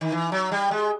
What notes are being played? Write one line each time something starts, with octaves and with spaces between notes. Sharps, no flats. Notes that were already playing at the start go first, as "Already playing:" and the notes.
D#3
E3
F#3
G3
G#3